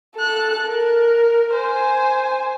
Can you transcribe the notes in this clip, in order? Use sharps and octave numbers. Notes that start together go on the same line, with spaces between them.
A4 F#6
A#4
C5 G#5